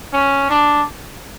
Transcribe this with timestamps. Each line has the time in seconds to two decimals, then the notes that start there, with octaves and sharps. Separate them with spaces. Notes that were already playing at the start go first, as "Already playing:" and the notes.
0.13 C#4
0.50 D4